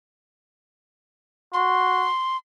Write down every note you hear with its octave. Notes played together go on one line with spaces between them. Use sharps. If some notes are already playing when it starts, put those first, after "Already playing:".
F#4 C6